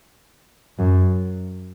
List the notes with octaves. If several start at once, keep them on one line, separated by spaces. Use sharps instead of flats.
F#2